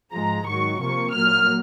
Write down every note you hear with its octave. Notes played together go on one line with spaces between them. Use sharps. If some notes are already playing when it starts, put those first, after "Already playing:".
G#2 F3 G#3 A#5
G#2 D#3 F#3 C#6
C3 F3 A#3 C#6
A#2 F#3 A#3 F6